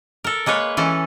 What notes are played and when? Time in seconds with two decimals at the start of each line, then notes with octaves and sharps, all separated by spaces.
0.24 A4 A#4
0.46 G#3 A#3 B4 C#5
0.77 E3 C#4 A4